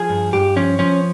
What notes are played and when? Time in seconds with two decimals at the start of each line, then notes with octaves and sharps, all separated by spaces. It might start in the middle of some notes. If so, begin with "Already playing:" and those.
Already playing: F3 G#4
0.10 G2
0.33 G2 G4
0.56 F3 C#4
0.79 F3 C#4